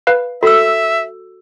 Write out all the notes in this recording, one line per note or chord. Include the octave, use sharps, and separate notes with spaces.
B4 F5
F#4 A4 E5 E6